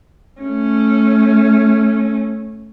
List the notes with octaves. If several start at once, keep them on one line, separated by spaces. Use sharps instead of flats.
A3 C#4